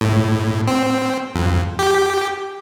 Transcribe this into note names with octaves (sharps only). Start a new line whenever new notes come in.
A2
C4
F2
G4